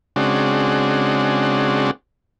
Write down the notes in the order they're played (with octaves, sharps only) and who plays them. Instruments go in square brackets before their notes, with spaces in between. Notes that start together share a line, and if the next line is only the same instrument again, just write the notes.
[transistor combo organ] C#3 G#3 C4 D4 F#4